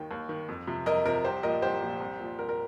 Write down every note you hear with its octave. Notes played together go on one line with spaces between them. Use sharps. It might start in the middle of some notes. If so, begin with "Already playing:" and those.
Already playing: D#2 D#3 G5
D#2
D#3
F2
C3 F3
F2 A#4 D#5
C3 F3 A#4
C2 G4 C5
A#2 F3 A#4 D#5
C2 G4 C5
A#2 F3
C2
A#2 F3
C2 A#4
A#4